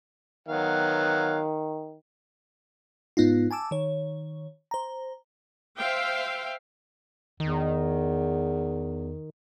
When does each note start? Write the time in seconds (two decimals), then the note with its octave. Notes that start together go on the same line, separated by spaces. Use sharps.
0.48 D#3 F#3 B3 F5
3.17 G#2 B3 D#4 F4
3.51 G#5 A5 D6 E6
3.71 D#3 C#5
4.71 C5 A#5
5.77 C5 E5 F5 G5
7.40 E2 D#3